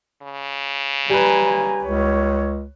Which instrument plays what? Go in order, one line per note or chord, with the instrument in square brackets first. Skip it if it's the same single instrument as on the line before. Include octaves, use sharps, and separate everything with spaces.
[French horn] C#3
[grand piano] G3 B4 [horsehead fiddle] G#5 A#5
[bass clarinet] C#2 [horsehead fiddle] C#5